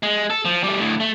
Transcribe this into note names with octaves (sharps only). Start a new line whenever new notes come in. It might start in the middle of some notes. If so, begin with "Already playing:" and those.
G#3
A4
F3
G3 A3
D2 A2
A3